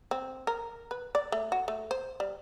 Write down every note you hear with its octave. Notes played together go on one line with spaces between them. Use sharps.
C4
A#4
B4
D5
A3
F#4
A3
C5
G3